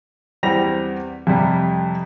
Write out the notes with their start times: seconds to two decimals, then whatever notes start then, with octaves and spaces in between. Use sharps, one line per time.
0.43 E2 G3 C4 G4 A#6 F7
1.27 F2 C3 G3